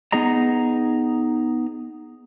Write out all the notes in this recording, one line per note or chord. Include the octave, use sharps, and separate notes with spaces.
B3 D#4 G#4 D#5 A#5